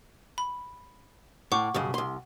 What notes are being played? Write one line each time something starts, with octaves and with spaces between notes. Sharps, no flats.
B5
A2 F#5 C#6 D6
B1 G2 C#3
C2 C6